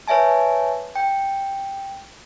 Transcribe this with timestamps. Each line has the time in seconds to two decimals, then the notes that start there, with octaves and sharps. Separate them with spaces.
0.08 B4 C#5 E5 G#5 A5
0.96 G5